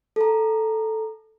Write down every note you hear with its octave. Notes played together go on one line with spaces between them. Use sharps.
A4 A#5